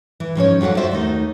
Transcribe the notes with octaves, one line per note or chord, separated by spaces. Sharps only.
E3
G#2 F3 C#4 C#5
F2 F#3 F#4 F5 F#5
F4 F#4 C5 D5 E5
D#2 A3 D#4 F#4